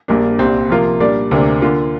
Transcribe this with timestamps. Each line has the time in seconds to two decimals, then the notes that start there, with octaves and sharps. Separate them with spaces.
0.08 A#1 A#2 G3 A#3 D4
0.39 C2 A#2 G3 C4
0.70 C3 F3 A#3 F4
1.00 A#2 G3 D4 A#4 D5
1.31 D2 C3 A#3 D4
1.61 D3 A#3 F4